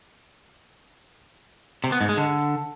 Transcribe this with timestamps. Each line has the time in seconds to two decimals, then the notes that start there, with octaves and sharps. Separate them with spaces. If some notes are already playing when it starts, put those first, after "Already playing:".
1.84 C3
1.92 B3
2.01 G#2
2.09 G#3
2.17 D3